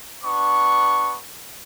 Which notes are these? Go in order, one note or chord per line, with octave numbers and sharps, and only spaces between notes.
B3 D4 C#6